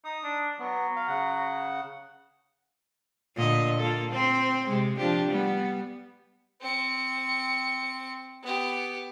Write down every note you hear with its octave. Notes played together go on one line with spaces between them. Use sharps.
D#4 D#6
D4
F#3 B3
F5
C#3 F#5
A#2 D3 D#5
A#3 F4 A4
C4 C5
C3 G#3
F3 D4 G4
G3 B3
C4 C#7
B3 G4